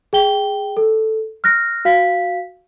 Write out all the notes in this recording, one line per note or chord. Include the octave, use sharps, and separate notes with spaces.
G#4 G5 G7
A4
F6 F#6 A#6
F#4 F5 B6